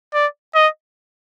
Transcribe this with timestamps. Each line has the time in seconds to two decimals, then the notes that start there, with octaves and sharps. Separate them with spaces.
0.14 D5
0.55 D#5